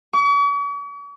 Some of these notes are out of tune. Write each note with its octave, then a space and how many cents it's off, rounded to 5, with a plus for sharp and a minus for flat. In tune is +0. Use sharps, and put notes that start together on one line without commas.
C#6 +45